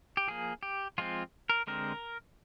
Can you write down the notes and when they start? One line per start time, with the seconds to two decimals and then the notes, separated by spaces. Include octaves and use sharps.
0.17 G4
0.27 F3 A#3 G#4
0.63 G4
0.98 F3 G#3 C4 F4
1.50 A#4
1.67 D3 G#3 C4 A#4